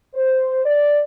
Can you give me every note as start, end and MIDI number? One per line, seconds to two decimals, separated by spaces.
0.15 0.60 72
0.65 0.98 74